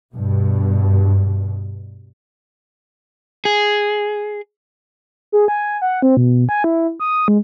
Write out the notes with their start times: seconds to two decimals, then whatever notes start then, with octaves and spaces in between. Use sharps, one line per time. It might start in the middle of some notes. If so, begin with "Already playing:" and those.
0.14 G2 B2
3.45 G#4
5.32 G#4
5.48 G#5
5.82 F#5
6.02 C4
6.17 B2
6.49 G#5
6.64 E4
7.00 D#6
7.28 G#3